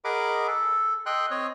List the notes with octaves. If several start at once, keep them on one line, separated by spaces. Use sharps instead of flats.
G#4 A#4 D#5 F#5 B5 D6
A4
A4 D#5 G5 C6 F#6
C4 C#5 D#5